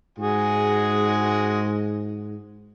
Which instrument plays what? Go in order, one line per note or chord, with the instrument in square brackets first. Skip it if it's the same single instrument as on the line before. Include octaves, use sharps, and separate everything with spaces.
[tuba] G#2 [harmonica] G#3 F#4 G#4